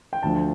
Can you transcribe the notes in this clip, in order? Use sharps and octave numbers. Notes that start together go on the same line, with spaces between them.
G5
D2 D3 F3 A5